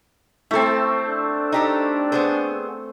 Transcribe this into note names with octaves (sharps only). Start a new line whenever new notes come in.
A3 C4 E4 A4
D4
D#4 G4 A4
B3 G#4 C5